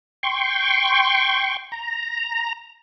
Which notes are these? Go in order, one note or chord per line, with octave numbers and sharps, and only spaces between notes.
G5 C6 C#6
A#5